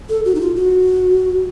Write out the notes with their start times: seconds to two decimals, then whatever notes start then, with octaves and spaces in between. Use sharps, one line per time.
0.09 A4
0.25 F#4
0.35 D#4
0.41 F4
0.56 F#4